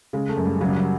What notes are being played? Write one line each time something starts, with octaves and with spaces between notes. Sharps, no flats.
C#3 G#3
A3
F#2
G3
C#3 F#3
G3
F#3